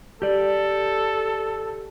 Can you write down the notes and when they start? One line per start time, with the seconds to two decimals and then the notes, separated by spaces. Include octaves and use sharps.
0.22 G4 A4 D5